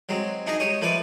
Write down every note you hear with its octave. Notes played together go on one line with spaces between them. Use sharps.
F#3 G#3 C4
D4 D#4 G#4 D#5 A#5
G#3 G4 C#5 D#6
F3 A3 B4 C#5 D5 D#6